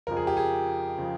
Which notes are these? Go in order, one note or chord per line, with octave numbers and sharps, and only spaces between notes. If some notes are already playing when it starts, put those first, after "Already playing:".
F2 C#3 F3 A#4
G#4
G4
G#4
C#3 F3